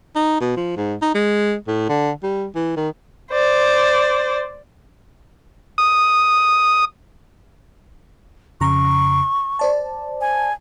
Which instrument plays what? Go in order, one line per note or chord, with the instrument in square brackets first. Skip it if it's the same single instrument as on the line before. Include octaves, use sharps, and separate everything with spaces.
[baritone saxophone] D#4
B2
F3
G#2
D#4
G#3
A2
D3
G3
E3
D#3
[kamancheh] C5 D5
[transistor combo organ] D#6
[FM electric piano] F2 C#3 A#5 [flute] C#6
[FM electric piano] C5 D5 A5
[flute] G#5